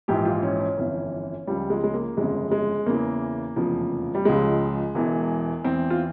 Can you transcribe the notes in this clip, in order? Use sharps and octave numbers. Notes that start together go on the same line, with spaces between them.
A#1 G#2 E3 G4
F4
C#4
C#4
G1 F2 E3
C#2 C#3 F3 G3
G#3
G#3
A#3
G1 F2 C#3 G#3
G#3
E2 C#3 E3 A#3
F1 E2 C#3 F3
G3
C#2 C#3 F3 G#3
E1 E2 E3
E2 E3 C4
F4